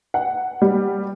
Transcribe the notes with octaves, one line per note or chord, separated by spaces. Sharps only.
F#5
G3